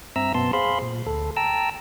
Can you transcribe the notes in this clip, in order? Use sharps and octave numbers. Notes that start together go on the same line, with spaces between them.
G2 C4 E5 A#5 E6
F#2 B2 B3 A5 C6
G#4 C5 F5 B5 C6
A#2
D2 A4
G5 A5 A#5 E6